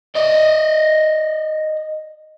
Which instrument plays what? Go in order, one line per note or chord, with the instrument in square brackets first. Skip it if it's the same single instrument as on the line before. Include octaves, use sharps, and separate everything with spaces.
[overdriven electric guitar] D5 D#5